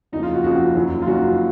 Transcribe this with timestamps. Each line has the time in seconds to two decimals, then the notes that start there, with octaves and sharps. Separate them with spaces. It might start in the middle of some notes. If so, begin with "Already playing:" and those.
0.12 F#1 F2 C#3 D#4
0.23 F4
0.34 F#4
0.44 F#1 F2 C#3 F#4
0.75 F#1 F#2 D#3 F#3
1.02 F4
1.07 F#1 F#2 D#3 F#3 F#4